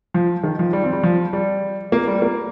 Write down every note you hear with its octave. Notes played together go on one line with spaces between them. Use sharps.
F3
D#3
F3
G3
C4
G3
F3
G3
A#3
G3
A#3